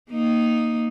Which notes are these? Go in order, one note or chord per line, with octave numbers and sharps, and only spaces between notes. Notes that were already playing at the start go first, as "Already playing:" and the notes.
A#3 D#4